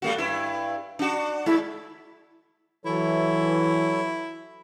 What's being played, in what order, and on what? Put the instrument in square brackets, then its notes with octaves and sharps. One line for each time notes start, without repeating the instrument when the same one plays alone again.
[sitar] G3 A3 F#4
G2 E4
D4 F#4
[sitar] G#3 [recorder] E4
[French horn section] E3 [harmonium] F#3 A4 C#5 [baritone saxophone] E4